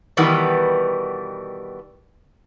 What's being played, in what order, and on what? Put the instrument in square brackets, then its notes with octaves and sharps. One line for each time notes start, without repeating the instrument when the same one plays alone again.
[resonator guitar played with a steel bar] B2 D#3 E3 G3 B3